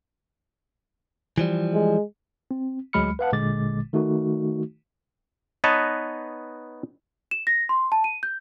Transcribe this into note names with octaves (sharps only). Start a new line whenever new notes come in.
E3 F3 G3
G#3
C4
D2 F#3 G#3 B5 F6 C#7
B4 F5 F#5 A5
G1 A#2 D3 G#3 D6 A6
D#3 A3 D#4 F#4
B3 D#4 B4 C#5 D#5 A5
E7
A#6
C6
A5
D#7
G6